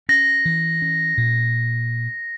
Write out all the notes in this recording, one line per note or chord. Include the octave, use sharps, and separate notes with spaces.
C#4 A#6
E3
C#4
A#2